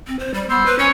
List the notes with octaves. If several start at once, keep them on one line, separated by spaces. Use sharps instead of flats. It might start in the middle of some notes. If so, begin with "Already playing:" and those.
C4
C5
G3 B5
B3 C5 B5 E6
B4
C#4 C#5 G#5